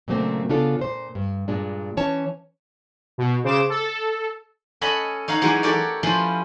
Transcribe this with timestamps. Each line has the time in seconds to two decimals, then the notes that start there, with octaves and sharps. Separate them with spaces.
0.08 A#2 C#3 F#3 A3 A#3 C4
0.49 C#3 B3 D4 F4 A4
0.79 A#2 C5
1.15 G2
1.48 G2 A#2 G#3 D4
1.97 E3 C#4 C#5 A5
3.18 B2
3.44 C#3 C5 D6 E7
3.69 A4
4.81 C#4 A4 C#5 D#5 F#5 B5
5.28 D#4 C#5 F5 F#5 A#5
5.42 E3 F#3 G#3 D#4 F#4 G4
5.63 F#4 G4 A4 A#4 C#5 D5
6.03 F3 C#4 E4 F4 B4 C5